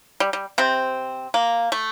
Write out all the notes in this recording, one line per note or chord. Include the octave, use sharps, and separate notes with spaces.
G3
G3
C3 C4
A#3
A3